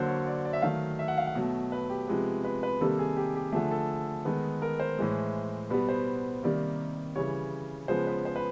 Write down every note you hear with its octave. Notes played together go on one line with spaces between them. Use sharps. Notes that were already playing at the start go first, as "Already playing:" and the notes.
Already playing: D3 F#3 A#3 C5
C#5
D5
D5
E5
D#3 F#3 A3 F5
E5
F#5
F5
F#5
B2 F#3 A3
B4
G4
C3 F3 G#3 B3
B4
B4
C3 D#3 G3 A#3 A4
G#4
G4
G4
D3 F3 A3 G#4
A4
D#3 G#3 B3
A#4
C5
A2 E3 G#3
B2 G3 B3 B4
C5
C3 D#3 G3 A#3 D5
C#3 E3 G3 C#5
C#3 F3 G#3 B3 C5
B4
C5
B4